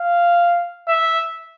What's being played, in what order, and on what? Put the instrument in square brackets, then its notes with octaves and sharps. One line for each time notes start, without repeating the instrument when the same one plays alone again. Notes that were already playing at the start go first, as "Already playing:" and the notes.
Already playing: [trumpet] F5
E5